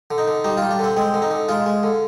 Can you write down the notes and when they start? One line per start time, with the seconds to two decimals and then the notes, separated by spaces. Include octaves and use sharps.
0.11 D3
0.18 D#4
0.28 D3
0.44 G3 D#4
0.57 G3 F4
0.71 D4
0.79 D3 C4
0.97 G#3 C4
1.14 D3
1.22 D#4
1.31 D3
1.49 G#3 F4
1.66 G#3
1.83 D3